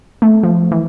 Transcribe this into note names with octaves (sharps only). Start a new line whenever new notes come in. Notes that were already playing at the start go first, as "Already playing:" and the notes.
A3
F3
E3